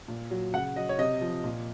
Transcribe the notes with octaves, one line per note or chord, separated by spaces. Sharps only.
A#2
F#3
C#3 F#5
F#3 D#5
C#5
C3 D#5
F3
A#2